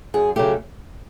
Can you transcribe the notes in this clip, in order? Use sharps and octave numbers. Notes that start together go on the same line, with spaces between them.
F#2 G#4
C#3 F#3 A3 G4